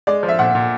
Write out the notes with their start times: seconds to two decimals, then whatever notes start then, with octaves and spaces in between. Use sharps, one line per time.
0.07 G#3 D5
0.23 F3
0.29 E5
0.39 A#2 F#5
0.55 A#2